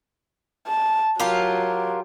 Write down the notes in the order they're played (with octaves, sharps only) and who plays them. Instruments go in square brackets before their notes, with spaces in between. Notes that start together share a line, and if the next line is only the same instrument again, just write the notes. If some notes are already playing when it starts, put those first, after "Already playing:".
[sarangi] A5
[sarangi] F#3 [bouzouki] F4 G4 A#4